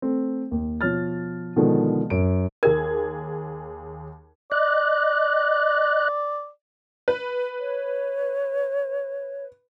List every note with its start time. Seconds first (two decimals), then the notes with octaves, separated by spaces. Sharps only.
0.02 A3 C4
0.51 D#2
0.81 B2 F3 C#5 F6 A6
1.56 B2 D3 D#3 F3 G#3 B3
2.10 F#2 D7
2.63 D#2 G#4 A#4 G#6
4.52 D5 D#5 F#6
7.08 B4
7.59 C#5